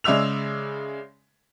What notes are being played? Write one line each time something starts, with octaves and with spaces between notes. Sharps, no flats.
C#3 G#3 D5 E5 E6 F7